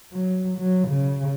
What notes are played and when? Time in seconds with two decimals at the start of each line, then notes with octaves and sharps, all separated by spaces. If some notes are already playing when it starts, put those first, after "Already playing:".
0.13 F#3
0.58 F#3
0.88 C#3